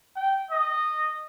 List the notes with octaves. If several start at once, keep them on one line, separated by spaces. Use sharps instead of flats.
G5
D#5